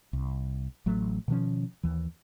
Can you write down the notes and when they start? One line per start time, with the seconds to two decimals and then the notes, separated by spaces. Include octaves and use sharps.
0.13 C2
0.86 A1 F#3 A3
1.28 B2 D#3 F3 C#4
1.83 D#2 E3